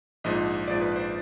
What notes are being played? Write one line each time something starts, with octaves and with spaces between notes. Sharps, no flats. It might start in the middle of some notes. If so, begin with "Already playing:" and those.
A#1 G#2 F3 D#5
A#1 G#2 F3 D5
B4
C5